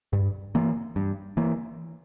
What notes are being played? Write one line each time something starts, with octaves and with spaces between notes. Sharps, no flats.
G2
E3 A#3
G2
E3 A#3